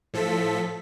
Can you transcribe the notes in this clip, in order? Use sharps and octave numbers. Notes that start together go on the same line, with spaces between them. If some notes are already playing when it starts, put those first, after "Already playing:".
A2 F3 A4 B6